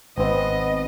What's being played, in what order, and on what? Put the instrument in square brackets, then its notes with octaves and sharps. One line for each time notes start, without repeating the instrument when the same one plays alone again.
[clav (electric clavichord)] G#1 C4 [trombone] B3 [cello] D#5